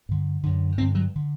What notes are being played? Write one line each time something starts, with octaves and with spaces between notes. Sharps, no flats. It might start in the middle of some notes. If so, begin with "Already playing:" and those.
G2 D3
F#2 D3
G2 D3 C4
F#3
D3